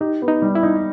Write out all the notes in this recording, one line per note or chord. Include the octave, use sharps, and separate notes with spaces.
D#4 G4
B3
D#4
G3
E4
D#4